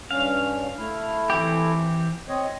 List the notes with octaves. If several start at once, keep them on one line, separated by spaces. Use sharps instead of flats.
G2 C#4 F5
A3 E4
E3 C4 G4
C4 C#5 D#5